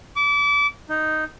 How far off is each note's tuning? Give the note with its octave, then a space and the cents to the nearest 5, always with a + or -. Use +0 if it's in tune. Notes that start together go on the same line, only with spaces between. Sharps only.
D6 -30
D#4 +0